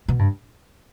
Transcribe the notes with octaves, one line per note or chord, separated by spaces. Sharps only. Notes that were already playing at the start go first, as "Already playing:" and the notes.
B2
G2